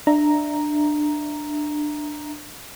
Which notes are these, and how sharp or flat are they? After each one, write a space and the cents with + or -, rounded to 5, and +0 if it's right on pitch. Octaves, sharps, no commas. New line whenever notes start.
D4 +20 E5 +0 A#5 +0